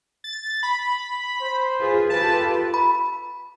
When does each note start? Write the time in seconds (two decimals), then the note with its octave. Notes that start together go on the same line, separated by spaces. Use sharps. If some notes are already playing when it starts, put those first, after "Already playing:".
0.24 A6
0.63 B5
1.41 C5
1.78 F4 G#4 B4
2.10 F4 G4 A4 B4 A5
2.74 B5